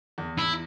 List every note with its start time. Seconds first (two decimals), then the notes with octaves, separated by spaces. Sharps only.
0.18 E2
0.38 E4